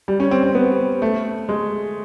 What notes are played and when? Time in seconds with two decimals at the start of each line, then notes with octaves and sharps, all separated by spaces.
0.08 G3
0.20 C#4
0.31 C4
0.43 C4
0.55 B3
1.02 A3
1.49 G#3